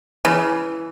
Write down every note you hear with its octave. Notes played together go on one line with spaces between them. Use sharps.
C#3 E3